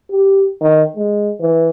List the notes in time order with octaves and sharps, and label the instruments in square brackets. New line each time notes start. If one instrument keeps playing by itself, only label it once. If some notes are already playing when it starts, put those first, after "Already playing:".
[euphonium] G4
D#3
G#3
E3